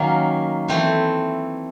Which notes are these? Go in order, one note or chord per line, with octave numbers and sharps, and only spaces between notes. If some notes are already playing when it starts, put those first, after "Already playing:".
Already playing: D#3 F#3 A#3 C#4
E3 A3 C4